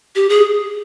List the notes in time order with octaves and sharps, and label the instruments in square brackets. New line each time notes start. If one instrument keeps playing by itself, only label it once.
[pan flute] G4
G#4